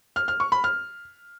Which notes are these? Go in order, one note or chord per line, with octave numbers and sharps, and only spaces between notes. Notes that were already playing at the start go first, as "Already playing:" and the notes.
F6
F6
C#6
B5
F6